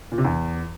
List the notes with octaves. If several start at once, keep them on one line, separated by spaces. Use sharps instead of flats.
A#2
C3
E2